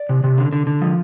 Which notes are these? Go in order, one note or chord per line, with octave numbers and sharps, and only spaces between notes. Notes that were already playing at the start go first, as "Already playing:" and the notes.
Already playing: D5
C3
C3
D3
D3
D3
F3